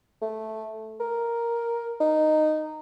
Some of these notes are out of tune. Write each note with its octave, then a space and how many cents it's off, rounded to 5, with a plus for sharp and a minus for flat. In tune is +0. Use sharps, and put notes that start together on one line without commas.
A3 -5
A#4 +5
D#4 -10